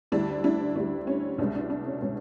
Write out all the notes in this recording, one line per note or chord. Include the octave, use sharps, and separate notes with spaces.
D2 D3 G3 D4 E4
D4 E4
D2 D3 G3 D4
C#4
C2 B2 G#3 D4
D4
D4
C#4
B2 G#3 C#4